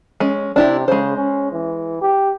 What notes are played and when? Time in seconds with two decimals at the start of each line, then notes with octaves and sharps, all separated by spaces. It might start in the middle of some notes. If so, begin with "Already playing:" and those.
0.20 G#3 C#4
0.56 C3 D4 E4 G4
0.88 C#3 G#3 C5
1.17 C#4
1.52 E3
2.01 G4